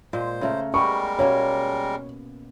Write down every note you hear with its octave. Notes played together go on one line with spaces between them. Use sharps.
A#2 G#3 C5
C#3 A3 A#4
G3 G#3 B3 G4 A#4 C#6
B2 A#3 C#4 C#5